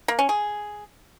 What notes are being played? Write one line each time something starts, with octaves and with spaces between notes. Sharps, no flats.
A#3
C#4
G#4